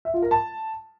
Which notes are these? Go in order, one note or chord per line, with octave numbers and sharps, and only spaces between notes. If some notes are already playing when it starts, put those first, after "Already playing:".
E5
F4
A#4
A5